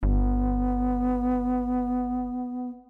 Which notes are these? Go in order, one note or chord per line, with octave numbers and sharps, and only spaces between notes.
G1 B3